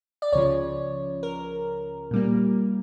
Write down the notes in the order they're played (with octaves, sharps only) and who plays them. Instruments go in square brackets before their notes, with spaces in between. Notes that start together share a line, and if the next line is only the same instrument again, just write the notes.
[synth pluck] D5
C#2 C#3 F3 C#5
A#4
A#2 G3 A#3